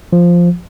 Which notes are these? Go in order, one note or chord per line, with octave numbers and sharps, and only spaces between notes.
F3